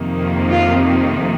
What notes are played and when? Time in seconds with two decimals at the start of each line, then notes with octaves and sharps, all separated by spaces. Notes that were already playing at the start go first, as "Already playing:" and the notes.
Already playing: F2 C3 D#3 A#3
0.51 F4